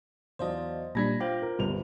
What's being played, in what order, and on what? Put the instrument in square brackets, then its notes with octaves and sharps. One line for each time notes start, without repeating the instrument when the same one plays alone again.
[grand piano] E2 F#3 [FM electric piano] C5 D#5 [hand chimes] D5 F5 A5
[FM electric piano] A#2 G3 D4 [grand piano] B5 G#6 B6 [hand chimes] A#6
[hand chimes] F4 C5 D6 [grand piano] F5 [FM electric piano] G5
[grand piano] A#4
[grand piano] G1 C#2 F7 [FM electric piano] G3